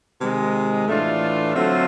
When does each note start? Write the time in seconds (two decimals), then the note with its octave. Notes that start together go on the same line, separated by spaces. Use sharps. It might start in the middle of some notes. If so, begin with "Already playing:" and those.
0.20 C3 D#3 G#3
0.87 A2 E3 A3 D4 F4
1.54 D3 F#3 A3 C4 F4